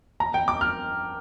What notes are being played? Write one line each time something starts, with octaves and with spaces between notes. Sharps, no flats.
A#5
G5
D6
F6